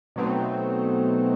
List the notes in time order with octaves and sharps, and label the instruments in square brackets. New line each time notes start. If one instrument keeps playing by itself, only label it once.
[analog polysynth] B2 F#3 A3 C4 D#4